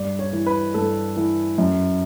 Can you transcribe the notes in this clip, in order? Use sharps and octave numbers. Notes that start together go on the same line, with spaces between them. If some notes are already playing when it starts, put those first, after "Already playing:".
Already playing: G2 D5
C#5
E3
B4
G2 A4
E3
F#2